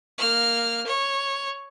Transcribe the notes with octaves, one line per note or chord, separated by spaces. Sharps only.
A#3 F6
C#5